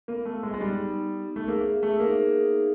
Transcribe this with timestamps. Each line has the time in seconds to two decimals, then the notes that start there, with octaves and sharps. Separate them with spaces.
0.08 A#3 B3
0.25 A3
0.32 B3
0.43 G#3
0.54 G#3 D#4
0.61 G3
0.78 D#4
1.01 D#4
1.24 B3
1.36 A3
1.48 A#3 G#4
1.71 E5
1.83 A3
1.93 D#4
2.00 A#3
2.17 G#4
2.40 D#4